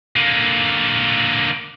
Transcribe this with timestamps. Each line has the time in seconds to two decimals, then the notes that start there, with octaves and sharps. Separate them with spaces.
0.16 D3 A#3